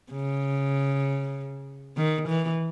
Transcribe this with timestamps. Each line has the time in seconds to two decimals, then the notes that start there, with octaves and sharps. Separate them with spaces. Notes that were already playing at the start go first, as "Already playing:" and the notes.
0.12 C#3
1.97 D#3
2.28 E3